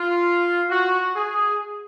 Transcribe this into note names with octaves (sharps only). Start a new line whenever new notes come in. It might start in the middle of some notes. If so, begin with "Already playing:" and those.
Already playing: F4
F#4
G#4